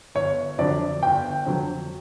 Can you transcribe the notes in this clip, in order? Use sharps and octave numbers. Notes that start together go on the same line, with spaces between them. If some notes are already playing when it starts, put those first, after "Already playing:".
G1 C#5
F2 D3 F#3 D5
G1 G5
F2 D3 F#3